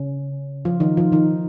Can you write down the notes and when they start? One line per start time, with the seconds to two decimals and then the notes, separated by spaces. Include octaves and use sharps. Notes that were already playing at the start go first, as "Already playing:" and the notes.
Already playing: C#3 C#4
0.65 F3 F4
0.80 D#3 D#4
0.97 F3 F4
1.12 D#3 D#4